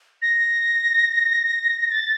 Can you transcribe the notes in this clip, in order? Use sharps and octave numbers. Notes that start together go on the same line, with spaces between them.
A#6
A6